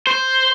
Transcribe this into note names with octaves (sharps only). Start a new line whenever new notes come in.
C5